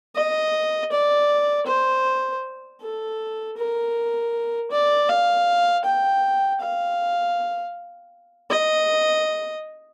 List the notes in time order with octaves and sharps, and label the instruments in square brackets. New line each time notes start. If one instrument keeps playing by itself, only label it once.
[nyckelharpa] D#5
D5
C5
A4
A#4
D5
F5
G5
F5
D#5